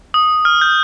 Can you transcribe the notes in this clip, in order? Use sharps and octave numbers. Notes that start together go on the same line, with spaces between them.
D#6
F6
G6